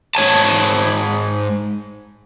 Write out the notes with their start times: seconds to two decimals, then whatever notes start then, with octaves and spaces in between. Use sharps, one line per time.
0.15 G#2 C#5 G#5 A5